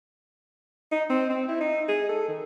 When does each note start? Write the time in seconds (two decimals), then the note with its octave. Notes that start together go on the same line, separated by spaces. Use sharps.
0.92 D#4
1.10 C4
1.30 C4
1.48 E4
1.60 D#4
1.88 G#4
2.09 A4
2.29 D#3